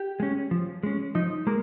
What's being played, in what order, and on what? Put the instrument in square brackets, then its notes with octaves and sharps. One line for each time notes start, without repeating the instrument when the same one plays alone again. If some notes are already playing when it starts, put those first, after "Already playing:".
Already playing: [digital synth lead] G4
[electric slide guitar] G#3 C#4
F3
G#3 C#4
[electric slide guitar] F3 [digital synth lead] D#4
[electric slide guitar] G#3 [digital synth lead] A#3